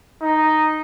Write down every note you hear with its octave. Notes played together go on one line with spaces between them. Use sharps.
D#4